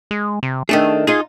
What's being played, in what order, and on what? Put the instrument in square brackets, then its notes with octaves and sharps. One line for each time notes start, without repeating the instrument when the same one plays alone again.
[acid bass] G#3
C3
[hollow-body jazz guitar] D#3 D4 G#4 [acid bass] A3
[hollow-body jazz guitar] D#4 F4 [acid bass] G#4